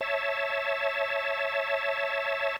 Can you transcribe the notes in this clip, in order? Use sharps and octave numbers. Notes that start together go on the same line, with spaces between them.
C#5 E5 A5